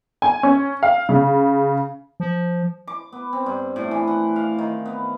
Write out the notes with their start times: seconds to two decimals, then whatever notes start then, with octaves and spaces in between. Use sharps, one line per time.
0.22 G#5
0.43 C#4
0.83 F5
1.09 C#3
2.20 F3
2.87 D6
3.12 B3
3.33 C4
3.46 G2
3.76 A2
3.91 E3
4.07 F#5
4.36 F5
4.59 D#3
4.85 B3